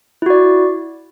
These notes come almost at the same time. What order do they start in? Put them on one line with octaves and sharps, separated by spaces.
E4 F#4 D5